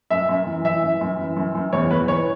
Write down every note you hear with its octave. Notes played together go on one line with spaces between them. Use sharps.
F#2 E5
F#2
E3
E3 E5
F#2
F#2
E3
F#2
F#2
E2 C#5
E2 B4
E3 C#5